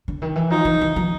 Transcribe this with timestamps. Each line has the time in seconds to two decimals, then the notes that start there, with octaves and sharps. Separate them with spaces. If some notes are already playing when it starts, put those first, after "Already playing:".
0.08 D3
0.22 D#3
0.36 E3
0.50 F3 D#4
0.65 E3
0.81 E3
0.96 F3